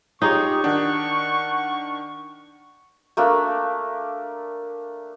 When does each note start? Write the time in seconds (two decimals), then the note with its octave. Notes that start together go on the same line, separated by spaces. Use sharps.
0.22 D#4 F4 G4 G#4 C#5 C#6
0.64 D#3 D4 F#5
3.17 A3 A#3 D4